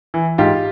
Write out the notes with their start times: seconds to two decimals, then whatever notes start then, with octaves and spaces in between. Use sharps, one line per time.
0.14 E3
0.38 G#2 F4 G4